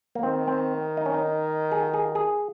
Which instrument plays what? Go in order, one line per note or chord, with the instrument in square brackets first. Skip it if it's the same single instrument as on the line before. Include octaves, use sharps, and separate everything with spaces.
[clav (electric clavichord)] A#3
[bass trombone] D#3 [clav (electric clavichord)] C4
[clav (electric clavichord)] C4
D#4
C#4
D#4
G#4
G#4
G#4